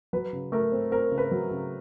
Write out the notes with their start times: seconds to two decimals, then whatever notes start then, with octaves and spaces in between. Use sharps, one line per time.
0.13 F#3 B4
0.33 C#3
0.52 A3 A#4
0.72 C4
0.92 C4 A#4
1.12 C#3
1.18 B4
1.31 F#3
1.51 C#3